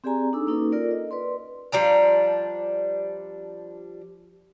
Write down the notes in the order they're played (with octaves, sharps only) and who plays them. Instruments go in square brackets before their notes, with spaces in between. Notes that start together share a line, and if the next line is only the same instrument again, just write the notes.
[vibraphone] C4 G4 G#4 D5 G#5 A#5
D4 D#4 A4 D6 E6
A#3 C#4 D#4 F#4 A4 B4
F4 A#4 D5
D#5
B4 D5 C6
[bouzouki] F3 G3 D4 A#5